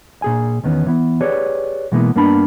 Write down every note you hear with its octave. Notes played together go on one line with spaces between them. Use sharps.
A#2 G#4 G#5
E2 D#3 B3 C#4
E3 B3
G4 G#4 B4 C#5 D5
B2 E3 G#3 A#3 B3 E4
G2 A#3 B3 D4 A5 B5